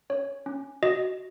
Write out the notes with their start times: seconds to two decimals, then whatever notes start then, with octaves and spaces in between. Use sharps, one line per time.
0.10 C#4 C#5
0.46 C#4
0.83 F#4 D#5